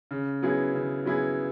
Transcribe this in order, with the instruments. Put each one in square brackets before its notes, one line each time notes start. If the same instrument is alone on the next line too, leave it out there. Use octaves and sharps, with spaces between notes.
[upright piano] C#3
F#3 B3 E4 G#4
C#3
F#3 B3 E4 G#4